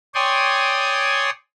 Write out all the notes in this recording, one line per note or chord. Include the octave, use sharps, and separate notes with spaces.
C#5 D5 G5 G#5 C6 D#6